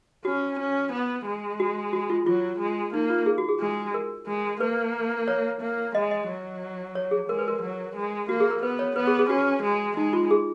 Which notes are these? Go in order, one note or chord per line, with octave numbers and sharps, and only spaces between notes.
C#4 F#4
C#4
B3
G#3
F#4
F#4
F4
F#3 F4
G#3
A#3 D#4
F4
G#4
F#4
G#4
G#3
A#4
G#3
A#3 B4
C#5
A#3
G#3 D#5
D#5
F#3
C#5
G#4
G#3 A#4
B4
A#4
F#3
G#3
A#3 F#4
G#4
A#4
B3 B4
C#5
B3 B4
G#4
G#4
C#4 F#4
G#3
G#3 D#4
F4
G#4